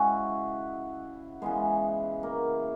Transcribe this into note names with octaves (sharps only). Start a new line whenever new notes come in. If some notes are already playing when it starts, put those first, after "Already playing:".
Already playing: C#3 G#3 E4 F#4
C#3 E3 G#3 B3
A#3